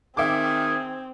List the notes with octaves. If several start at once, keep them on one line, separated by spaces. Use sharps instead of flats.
D#3 C4 G#4 E5 D6